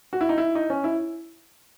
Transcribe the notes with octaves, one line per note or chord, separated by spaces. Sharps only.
F#4
E4
D#4
E4
D#4
C#4
E4